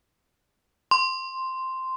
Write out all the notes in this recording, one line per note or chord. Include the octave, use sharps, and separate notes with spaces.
C6